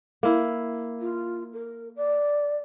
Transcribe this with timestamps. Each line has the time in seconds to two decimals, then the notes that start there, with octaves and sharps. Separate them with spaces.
0.23 A#3 E4
0.99 F4
1.53 A#4
1.95 D5